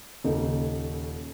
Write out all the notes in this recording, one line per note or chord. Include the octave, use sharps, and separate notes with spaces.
D#1 C#3 A#3 D#4 A4